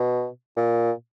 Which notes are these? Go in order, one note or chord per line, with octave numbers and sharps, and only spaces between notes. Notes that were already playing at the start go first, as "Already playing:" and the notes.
Already playing: B2
A#2